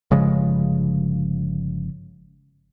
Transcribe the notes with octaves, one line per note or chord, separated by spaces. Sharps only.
G1 C#3 F3 G#3